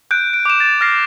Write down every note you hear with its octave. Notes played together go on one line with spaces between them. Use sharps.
F#6 G6 D7
D7
D6 E7
A6
F6 A6 A#6 C7